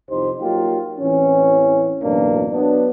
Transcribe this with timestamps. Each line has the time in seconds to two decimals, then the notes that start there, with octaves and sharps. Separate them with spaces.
0.10 C2 F2 D#4 G4 C5
0.40 F#3 A#3 D#4 F4 G4
0.99 A1 E3 C4 C#4
2.03 A1 F#2 B2 A#3 D4
2.51 F#3 B3 D4